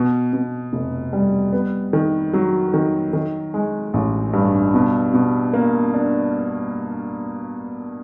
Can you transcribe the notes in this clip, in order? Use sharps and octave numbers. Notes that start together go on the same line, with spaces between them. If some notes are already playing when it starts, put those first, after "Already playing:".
Already playing: B2
B2
F1
G3
B3
D#3
F#3
D#3
D#3
G#3
A1
G2
B2
B2
A#3
D4